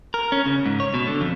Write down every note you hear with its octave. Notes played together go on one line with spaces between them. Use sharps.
A#4
C#4
C#3
G#2
C#5
B2
D3
F2